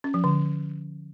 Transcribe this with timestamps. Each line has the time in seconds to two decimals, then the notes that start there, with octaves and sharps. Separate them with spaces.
0.04 C#4
0.14 F3
0.24 D3